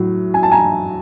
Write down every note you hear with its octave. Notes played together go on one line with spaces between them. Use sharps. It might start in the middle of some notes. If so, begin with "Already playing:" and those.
Already playing: A2 F#3
G#5
A5
G#5 A#5